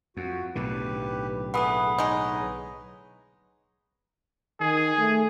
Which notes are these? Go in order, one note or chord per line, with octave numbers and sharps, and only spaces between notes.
F2 F#4
B1 A2 D3 G4 B4
E3 A3 B3 G#4 B4 F#5 B5 D#6
G#3 D#4 G#4 B4 C#5
D#3 G#4
A3